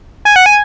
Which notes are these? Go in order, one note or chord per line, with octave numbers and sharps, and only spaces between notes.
G#5
F#5
G#5